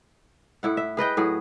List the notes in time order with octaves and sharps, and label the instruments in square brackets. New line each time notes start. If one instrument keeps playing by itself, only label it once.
[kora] A2 E4 F#5
E5
G#4 B4 D#5 G5
A2 F#3 G#4